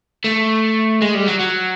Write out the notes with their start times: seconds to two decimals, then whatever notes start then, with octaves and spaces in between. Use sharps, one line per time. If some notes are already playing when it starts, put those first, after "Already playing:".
0.24 A3
1.02 G#3
1.14 G3
1.27 F#3
1.39 F#3